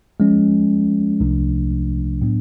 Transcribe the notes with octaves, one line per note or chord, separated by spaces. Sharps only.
F3 G#3 C#4
C2 C3 F3 A3 D4
A2 F#3 B3 D4